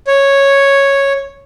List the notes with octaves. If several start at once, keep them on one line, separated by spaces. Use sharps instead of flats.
C#5